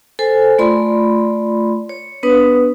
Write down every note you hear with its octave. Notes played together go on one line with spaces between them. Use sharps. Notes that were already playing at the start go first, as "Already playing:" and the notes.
A4 C5 G#5
A3 F4 D5 B5 C6
C#5
B3 D4 B4 D#6